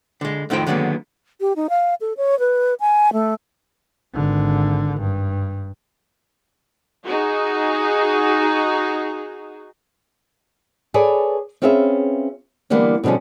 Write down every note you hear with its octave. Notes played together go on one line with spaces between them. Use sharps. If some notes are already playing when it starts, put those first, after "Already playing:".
D3 G#3
F2 A2 D#3 D#4 C5 G5
D3 D#3 F#3 G#3 A#3 B3
G4
D#4
F5
A4
C#5
B4
G#5
A3
G#1 D3
G2
D#4 F#4 G#4
G#4 A4 B4 C#5 D5 G#5
C4 C#4 F4 G#4 B4 E5
D3 E3 G3 A#3 B3 D4
B2 D3 F3 G3 C#4